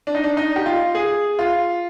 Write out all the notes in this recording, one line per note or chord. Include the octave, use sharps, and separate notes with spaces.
D4
D#4
D4
D#4
G4
F4
G#4
F4